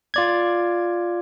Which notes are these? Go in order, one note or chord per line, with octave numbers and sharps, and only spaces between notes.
F4 D5 G#6